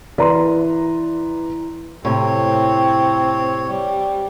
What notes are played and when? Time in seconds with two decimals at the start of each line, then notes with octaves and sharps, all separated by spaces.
0.18 E3 B4 D5 A#5 C6
2.05 A2 C3 C4 C#5
3.68 G3